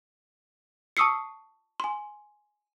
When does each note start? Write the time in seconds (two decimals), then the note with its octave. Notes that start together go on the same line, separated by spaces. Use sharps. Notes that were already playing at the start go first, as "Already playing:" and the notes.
0.97 A5 C#6 D#6 E6 C7 C#7
1.80 G#5 C6